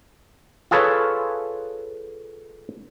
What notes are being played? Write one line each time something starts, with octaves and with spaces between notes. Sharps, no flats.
F4 G#4 A4 B4 C#5